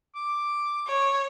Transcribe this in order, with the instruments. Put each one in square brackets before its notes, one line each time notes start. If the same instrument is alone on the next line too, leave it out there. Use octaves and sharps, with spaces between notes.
[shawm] D6
[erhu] C#5